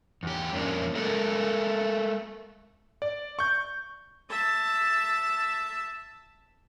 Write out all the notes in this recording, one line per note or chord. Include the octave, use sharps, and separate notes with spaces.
E2 G4
F2 F3 A#3 C#4 D4
G#3 A3 F#4 A4 A#4 D#5
D5
C#6 G6
E5 A5